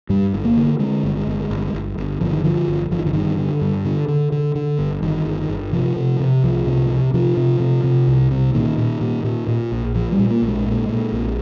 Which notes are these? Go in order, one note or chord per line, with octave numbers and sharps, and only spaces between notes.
G2 G3
G1
A#3
D3
D3 G#3
G1
G1
G1
G1
G1
G1 F3
D#3
D3 F3
G1
G1 F3
D#3
D3
G2 D#3
D3
G2
D3
D3
D3
D3
G1
G1 D#3
G1
G1
C3 F3
C3
C3
C2 F3
C3
C3
C3 F3
C3
C3
C3
C2
C3
A#2 D#3
A#2
A#2
A#2
A#2
A#1
A#2 F3
G3
A#2
A#3
A#1
G#3
A#2
A#2
A#1